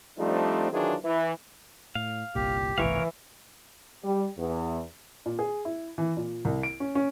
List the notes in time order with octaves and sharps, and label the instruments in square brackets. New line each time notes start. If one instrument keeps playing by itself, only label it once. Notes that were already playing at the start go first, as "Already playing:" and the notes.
[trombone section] F3 G3 A3 C4 D4 D#4
D#3 E3 F#3 D4 F4 G#4
E3
[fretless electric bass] A2 [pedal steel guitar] F5
[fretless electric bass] G1 C2 A#2 [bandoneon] G4
[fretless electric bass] G1 C2 A2 [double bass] E3 [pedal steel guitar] A#4 C#5 F5
[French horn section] G3
E2
[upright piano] A#2
G#4
E4
E3
A#2
C2
D7
C#4
C#4